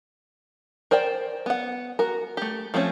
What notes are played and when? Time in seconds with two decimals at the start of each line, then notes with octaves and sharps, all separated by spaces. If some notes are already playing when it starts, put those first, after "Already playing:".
0.91 A#4 C5 D5 G5
1.46 B3 F#5
1.99 F#4 A#4
2.37 A3 G4
2.74 F3 A3 C4 C#4